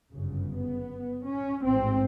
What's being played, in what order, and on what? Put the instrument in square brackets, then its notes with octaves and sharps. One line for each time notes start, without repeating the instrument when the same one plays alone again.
[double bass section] G1 F#2 C#3
B3
C#4
A1 G#2 C4